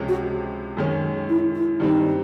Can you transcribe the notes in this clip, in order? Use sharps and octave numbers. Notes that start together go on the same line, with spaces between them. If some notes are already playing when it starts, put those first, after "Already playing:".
Already playing: C#2 C3 F3 G#3 C#4
F#4
F#2 D#3 G#3 C#4
E4
E4
G2 D#3 G3 C4 D#4